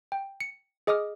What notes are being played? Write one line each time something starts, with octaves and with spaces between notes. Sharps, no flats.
G5
C#7
G#4 D#5 D6 D#6 F6